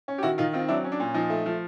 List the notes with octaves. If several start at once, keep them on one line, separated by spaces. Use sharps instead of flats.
C#4
G4
D#3 E4 F#4
D#3 D#4 F4
C4 D#4 F4
F#3 D4 E4
C#4
D4
A#2
F3 D#4
A3
F3